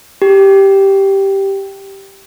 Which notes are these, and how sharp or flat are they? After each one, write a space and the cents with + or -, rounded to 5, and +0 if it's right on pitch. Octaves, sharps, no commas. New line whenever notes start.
G4 -5